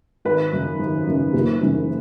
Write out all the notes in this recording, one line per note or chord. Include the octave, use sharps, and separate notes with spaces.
G#1 B4
F#2 C#3
G#1
F#2 C#3
F#1
F#2 C#3 E3